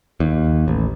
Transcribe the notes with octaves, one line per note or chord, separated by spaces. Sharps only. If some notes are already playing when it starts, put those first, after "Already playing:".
D#2
A1